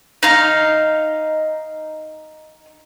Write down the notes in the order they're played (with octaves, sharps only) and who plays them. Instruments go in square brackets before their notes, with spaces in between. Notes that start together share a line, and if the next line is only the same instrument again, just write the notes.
[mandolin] D#4 F5